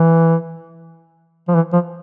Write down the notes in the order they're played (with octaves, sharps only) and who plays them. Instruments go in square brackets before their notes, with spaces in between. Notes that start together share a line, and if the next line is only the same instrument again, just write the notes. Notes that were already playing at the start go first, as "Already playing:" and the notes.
Already playing: [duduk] E3
F3
E3
F3